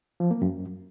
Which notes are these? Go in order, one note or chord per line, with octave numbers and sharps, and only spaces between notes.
F3
A#3
F#2